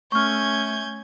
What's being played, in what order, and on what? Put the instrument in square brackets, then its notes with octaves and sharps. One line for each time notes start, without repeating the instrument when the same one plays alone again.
[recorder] A3 [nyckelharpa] C#4 [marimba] C#6 F6 [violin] G6 G#6